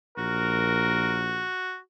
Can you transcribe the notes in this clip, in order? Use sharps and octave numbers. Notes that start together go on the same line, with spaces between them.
A#1 F#4 A#4